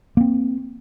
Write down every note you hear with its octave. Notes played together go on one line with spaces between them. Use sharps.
A#3 C4